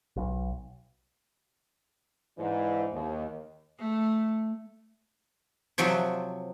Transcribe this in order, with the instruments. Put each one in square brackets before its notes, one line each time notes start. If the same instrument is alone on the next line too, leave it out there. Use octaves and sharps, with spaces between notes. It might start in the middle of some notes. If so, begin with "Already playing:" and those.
[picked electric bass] B1
[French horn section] G#2 E3 D4
D#2
[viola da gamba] A3
[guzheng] C3 F3 F#3